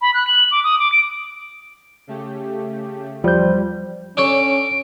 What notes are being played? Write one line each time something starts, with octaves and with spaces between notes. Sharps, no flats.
B5
F#6
F#7
D6
D#6
D6
D7
C#3 A3 G4
E2 F3 G3 C5 G6
C#4 D4 A4 C#5 D7